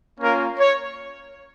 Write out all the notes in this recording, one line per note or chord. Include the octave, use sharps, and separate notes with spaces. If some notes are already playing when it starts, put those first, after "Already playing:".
A#3 C#4 F4 A#4
C#5